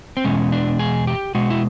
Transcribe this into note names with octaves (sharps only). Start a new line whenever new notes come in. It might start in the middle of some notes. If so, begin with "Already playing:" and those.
C4
E2 B2 G#3 C#4
D4
G#4
G4
B2 G#3 F#4
E4